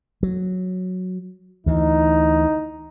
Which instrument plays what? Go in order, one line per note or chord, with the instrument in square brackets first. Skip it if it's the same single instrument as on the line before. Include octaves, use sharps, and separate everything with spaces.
[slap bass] F#3
[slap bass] D2 E3 [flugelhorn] D#4